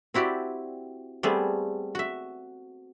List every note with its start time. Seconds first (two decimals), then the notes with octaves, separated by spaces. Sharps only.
0.14 C4 E4 F#4 G4 D5
1.23 G3 A3 B3 C4 G#4
1.95 F#4 E5